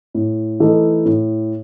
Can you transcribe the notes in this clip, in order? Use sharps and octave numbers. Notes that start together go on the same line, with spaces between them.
A2
E3 A3 D#4
A2